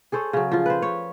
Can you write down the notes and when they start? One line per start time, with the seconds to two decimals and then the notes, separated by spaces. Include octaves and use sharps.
0.12 G#4 A4 C5 C#5
0.33 C#3 F#3
0.52 F3 F4
0.66 B4 C5
0.82 C#5